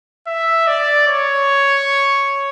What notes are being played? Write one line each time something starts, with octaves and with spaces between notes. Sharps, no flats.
E5
D5
C#5